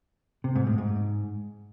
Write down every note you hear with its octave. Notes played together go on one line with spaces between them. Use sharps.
C3
G#2
A2
G#2